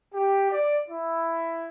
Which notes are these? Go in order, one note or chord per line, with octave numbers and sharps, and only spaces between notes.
G4
D5
E4